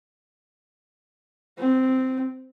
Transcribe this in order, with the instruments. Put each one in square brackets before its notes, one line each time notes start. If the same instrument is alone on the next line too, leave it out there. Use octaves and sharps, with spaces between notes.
[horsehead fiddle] C4